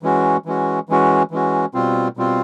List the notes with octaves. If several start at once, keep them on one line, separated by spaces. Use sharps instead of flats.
E3 G#3 C#4 F#4
E3 G#3 C#4 F#4
E3 G#3 C#4 F#4
E3 G#3 C#4 F#4
B2 G3 C4 F4
B2 G3 C4 F4